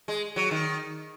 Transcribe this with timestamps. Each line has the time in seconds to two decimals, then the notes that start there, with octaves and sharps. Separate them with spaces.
0.08 G#3
0.36 F#3
0.51 D#3